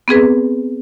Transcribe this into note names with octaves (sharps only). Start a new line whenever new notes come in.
B3 C4 G#4 B4